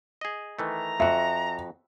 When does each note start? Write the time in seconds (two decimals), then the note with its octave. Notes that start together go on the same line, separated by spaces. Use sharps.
0.21 G#4 D#5
0.59 D#3 E3 A3 A#5
1.00 F2 F#4 E5